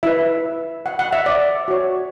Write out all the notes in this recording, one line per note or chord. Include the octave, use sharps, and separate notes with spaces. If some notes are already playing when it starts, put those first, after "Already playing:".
E4 B4 E5
F#5
F#5
E5
D5
F#4 C#5